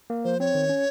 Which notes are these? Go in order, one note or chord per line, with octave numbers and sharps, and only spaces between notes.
A#3
F3 C5
C4 C#5
D#3
C#4